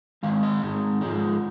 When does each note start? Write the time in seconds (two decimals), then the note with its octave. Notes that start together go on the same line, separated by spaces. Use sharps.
0.23 G#2 D#3 G#3 F5
0.43 D#5
0.63 G#2 D#3 G#3
1.01 G#2 F3 G#3